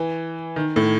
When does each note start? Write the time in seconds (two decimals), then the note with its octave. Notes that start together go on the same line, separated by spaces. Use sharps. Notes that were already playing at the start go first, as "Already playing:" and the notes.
Already playing: E3
0.56 D#3
0.76 A2